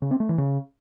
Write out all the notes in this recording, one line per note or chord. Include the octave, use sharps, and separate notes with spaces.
C#3
C4
A3
E3
C#3